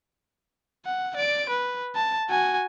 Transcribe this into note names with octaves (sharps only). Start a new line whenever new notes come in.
F#5
D5 D7
B4
A5
F#4 G#5